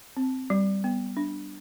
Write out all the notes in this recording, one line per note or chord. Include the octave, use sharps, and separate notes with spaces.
C4
G3
B3
D4